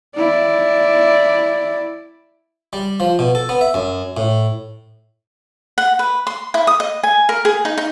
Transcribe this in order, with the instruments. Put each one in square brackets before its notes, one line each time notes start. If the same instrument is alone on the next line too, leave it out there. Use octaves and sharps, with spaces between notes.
[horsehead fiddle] E4 D5
[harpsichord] G3
F3
B2
A4
B3
E5
F#2
A2
[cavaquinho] F#5
B4
C6
E4
D#6
D#5
G#5
A#4
G#4
D#4
D#4